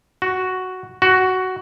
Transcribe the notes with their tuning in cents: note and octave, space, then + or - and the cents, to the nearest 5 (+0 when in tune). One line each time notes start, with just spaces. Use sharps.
F#4 +5
F#4 +10